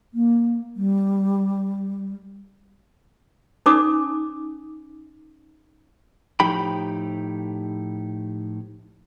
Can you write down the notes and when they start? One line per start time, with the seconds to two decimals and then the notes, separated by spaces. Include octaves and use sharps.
0.14 A#3
0.76 G3
3.66 C#4 D#4 G#5 D6 D#6
6.40 A2 F3 D#4 G4 G5 B5